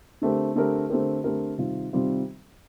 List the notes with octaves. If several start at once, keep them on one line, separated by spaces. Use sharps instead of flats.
D3 A3 C4 G4 A#4
D3 A3 C4 G4 A#4
D3 A3 C4 G4 A#4
D3 A3 C4 G4 A#4
C3 D#3 G3 C4 F4
C3 D#3 G3 C4 F4